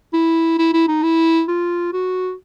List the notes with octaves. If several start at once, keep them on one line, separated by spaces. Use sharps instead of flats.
E4
E4
E4
D#4
E4
F4
F#4